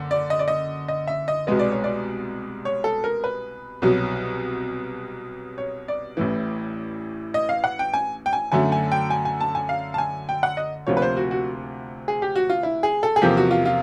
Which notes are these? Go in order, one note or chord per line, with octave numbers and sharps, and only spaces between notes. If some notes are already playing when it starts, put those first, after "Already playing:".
Already playing: F#1 D3
D5
D#5
D5
D#5
D#5
E5
D#5
C2 B2 G#3 B3 D#5
D5
C#5
D5
C#5
A4
A#4
B4
C2 B2 F#3
C#5
D5
A1 A2 E3
D#5
F5
F#5
G5
G#5
G5
G#5
F#2 D3 F#3 A3 G#5
G#5
G5
G#5
G#5
A5
G#5
F5
A5
G#5
G5
F#5
D#5
D2 C3 F3 A#3 C#5
B4
C5
F#4
F#4
G#4
G4
F#4
F4
E4
G#4
A4
G#4
E2 C3 F3 A#3 G4
F#4
F4
F4